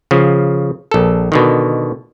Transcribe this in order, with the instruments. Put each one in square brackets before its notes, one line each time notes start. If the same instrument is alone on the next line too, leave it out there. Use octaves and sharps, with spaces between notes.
[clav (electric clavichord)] C#3 F3
A#1 A4
B2 D3 D#3